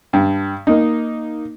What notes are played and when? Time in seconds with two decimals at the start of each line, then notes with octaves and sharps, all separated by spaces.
0.13 G2
0.67 A#3 D#4